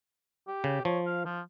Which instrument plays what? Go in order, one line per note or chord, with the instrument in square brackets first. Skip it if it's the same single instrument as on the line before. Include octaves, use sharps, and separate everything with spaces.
[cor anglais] G4
[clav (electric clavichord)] C#3
[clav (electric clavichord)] F3 [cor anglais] C#5
[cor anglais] F5
F3